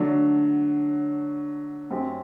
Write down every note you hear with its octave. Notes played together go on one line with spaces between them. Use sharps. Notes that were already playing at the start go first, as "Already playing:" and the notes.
Already playing: D3 F#3 A3 D4
F#2 F#3 C4 G4